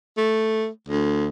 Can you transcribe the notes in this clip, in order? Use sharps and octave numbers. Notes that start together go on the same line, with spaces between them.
A3
D2